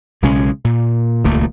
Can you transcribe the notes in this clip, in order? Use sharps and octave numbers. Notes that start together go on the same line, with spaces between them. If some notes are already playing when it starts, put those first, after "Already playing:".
B1 C#3 G#3 C#4
A#2
D#1 C#2 A3 A#3